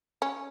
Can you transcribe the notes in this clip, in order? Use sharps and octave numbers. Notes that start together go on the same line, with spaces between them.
C#4